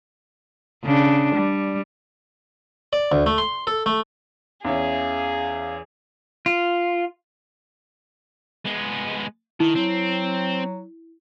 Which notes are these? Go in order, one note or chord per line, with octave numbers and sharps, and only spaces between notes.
C#3 D4
G3
D5
D2
A3
C6
A4
A3
E2 C#4 E4 G#4 F5
F4
G#3 B3
D#3 E4
F#3 C4